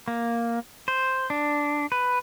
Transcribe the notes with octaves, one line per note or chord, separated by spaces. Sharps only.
A#3
C5
D4
B4